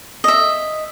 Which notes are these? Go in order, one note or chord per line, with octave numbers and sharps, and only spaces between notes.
D#5 E5